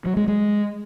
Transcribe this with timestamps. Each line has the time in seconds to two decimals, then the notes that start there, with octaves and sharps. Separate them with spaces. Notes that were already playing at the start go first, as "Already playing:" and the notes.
0.06 F#3
0.17 G#3
0.28 G#3